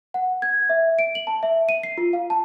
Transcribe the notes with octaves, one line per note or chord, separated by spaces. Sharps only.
F#5
G#6
E5
D7
F#7
A5
E5
D#7
C7
F4
F5
A5